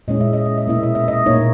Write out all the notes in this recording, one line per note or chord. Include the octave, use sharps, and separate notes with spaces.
A#2 G#3 C#4 E4 D#5
E5
D#5
E5
D#5
B2 A#3 C#4 E4 E5
D#5
E5
D#5
A#2 A#3 D#4 C#5